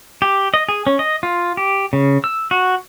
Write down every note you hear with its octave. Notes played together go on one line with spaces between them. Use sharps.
G4
D#5
G#4
C#4
D#5
F4
G4
C#3
E6
F#4